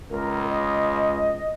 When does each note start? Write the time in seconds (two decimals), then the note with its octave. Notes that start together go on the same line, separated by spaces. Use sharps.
0.10 C#2 A#4
0.50 D#5